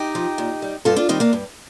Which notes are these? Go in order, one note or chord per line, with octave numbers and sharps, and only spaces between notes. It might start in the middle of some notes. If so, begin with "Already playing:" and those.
Already playing: D#4 G4
F3
A#2
G3
G2 F4 A4
D4 F4
D#3 G3 C4 D#4
A#3 D4
G2